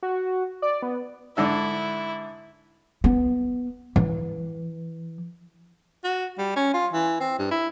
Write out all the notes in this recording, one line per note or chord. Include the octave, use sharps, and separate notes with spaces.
F#4
D5
B3
G#2 D3 E4 E5
B3
E3
F#4
G3
C#4
F4
E3
C4
G2
E4